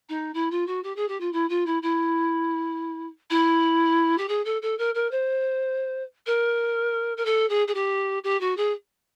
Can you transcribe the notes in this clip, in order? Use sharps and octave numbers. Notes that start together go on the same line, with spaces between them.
D#4
E4
F4
F#4
G4
G#4
G4
F4
E4
F4
E4
E4
E4
G4
G#4
A4
A4
A#4
A#4
C5
A#4
A#4
A4
G#4
G#4
G4
G4
F#4
G#4